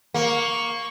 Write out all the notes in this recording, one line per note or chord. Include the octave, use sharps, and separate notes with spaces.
A#3 C#6